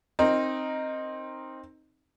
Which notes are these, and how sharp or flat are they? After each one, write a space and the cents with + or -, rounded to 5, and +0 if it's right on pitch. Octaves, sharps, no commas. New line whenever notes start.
C4 +15 D#4 +0 A#4 +0